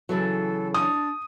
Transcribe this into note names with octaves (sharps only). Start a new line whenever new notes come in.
C#3 E3 F#3 A4
D4 D#6